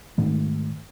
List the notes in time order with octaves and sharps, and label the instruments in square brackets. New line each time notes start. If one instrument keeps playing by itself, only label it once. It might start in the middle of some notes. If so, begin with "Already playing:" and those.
[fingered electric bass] G#2 D#3 A3